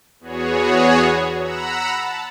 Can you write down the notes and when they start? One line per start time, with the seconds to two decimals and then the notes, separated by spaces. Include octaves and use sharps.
0.20 E2 B3 F#4 G#4 C#5
1.38 F#5 A#5 B5 E6
1.97 A5